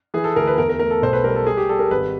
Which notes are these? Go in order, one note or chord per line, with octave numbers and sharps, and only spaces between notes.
E3 G#4
A4
D2 A#4
B4
E2 A#4
A#4
A3 A#4
A4
B1 C5
B4
G3 A#4
A4
G3 G#4
G4
G3 A4
A#4
G#1 B4